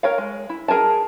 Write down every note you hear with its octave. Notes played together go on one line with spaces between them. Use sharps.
A#4 C#5 F5
G#3
E4
G#4 A#4 G#5 A5